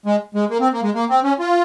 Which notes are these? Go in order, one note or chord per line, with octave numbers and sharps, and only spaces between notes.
G#3
G#3
A#3
C4
A#3
G#3
A#3
C4
C#4
F4